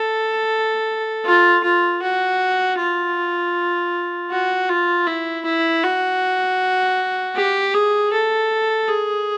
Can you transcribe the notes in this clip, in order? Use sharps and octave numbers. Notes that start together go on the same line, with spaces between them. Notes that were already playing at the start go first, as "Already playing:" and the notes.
Already playing: A4
F4
F4
F#4
F4
F#4
F4
E4
E4
F#4
G4
G#4
A4
G#4